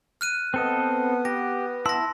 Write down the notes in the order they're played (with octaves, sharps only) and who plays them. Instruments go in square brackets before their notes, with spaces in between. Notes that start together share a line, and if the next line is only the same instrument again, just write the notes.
[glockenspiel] F6 F#6 D#7
[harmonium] B3 [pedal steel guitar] C4 A4 D#5
[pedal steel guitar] G4 [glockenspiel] A#6
[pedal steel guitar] E4 A5 E6 [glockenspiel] C6 A#6